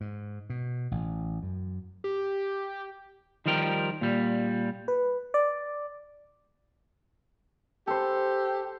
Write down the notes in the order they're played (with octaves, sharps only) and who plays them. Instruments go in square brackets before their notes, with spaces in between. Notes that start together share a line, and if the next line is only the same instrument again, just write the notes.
[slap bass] G#2
B2
A1
F#2
[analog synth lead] G4
[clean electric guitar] D#3 F3 G3 A#4 G5
A#2 G3
[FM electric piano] B4
D5
[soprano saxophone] G4 [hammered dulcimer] A4 C5